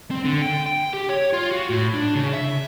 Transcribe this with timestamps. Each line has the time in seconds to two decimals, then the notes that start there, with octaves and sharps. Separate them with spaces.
0.11 C4
0.25 D3
0.42 G5
0.66 G5
0.93 G4
1.09 C#5
1.33 F4
1.51 F#4
1.70 A2
1.94 D4
2.15 C#3
2.33 E5